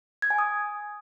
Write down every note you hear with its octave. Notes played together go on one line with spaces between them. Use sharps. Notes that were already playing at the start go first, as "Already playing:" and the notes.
G#6
G#5
D#6